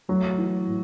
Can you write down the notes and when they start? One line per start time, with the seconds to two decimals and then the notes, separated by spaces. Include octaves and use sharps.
0.09 F#3 A3
0.38 E3
0.67 A2